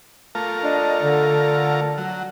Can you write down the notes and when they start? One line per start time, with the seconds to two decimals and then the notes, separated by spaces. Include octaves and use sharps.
0.35 A3 F4 A#4
0.63 D4 D#5
1.02 D3
1.98 F#3